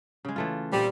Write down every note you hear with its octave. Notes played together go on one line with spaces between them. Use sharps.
C#3 G#3
E3 A3 F4
A#2 G3 C4